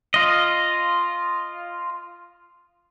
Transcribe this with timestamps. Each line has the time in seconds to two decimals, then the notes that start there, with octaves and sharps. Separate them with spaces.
0.14 F4 D#5